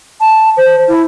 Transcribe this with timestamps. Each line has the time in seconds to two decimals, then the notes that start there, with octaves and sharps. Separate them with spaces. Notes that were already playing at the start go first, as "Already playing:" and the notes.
0.21 A5
0.57 C5
0.88 E4